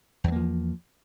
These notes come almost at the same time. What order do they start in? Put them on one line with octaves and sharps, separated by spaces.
E2 F#3 A#3 F3